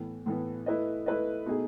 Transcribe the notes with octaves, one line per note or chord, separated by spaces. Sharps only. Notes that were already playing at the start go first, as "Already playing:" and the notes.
Already playing: A2 E3 B3
A2 E3 B3
A3 E4 B4 D#5
A3 E4 B4 D#5
B2 A3 D#4 G#4